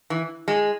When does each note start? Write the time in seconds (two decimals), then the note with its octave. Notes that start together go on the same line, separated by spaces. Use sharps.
0.10 E3
0.48 G#3